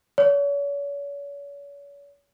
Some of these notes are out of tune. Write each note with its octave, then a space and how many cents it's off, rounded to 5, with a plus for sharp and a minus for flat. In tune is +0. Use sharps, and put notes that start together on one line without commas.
C#5 +40